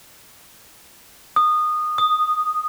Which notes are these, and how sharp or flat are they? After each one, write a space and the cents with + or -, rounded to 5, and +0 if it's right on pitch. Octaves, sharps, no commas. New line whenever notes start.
D#6 -20
D#6 -5